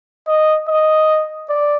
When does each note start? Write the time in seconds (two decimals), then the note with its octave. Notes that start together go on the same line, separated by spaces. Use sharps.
0.27 D#5
0.68 D#5
1.49 D5